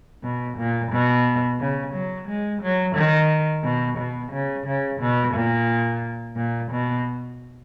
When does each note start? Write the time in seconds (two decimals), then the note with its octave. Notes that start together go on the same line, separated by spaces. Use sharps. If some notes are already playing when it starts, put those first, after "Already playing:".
0.23 B2
0.58 A#2
0.92 B2
1.59 C#3
1.94 F#3
2.28 G#3
2.62 F#3
2.96 D#3
3.64 B2
3.98 B2
4.32 C#3
4.66 C#3
5.00 B2
5.34 A#2
6.36 A#2
6.71 B2